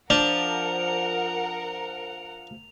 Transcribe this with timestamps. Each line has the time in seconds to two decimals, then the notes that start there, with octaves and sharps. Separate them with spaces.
0.10 F3 D4 A#4 F#5 F7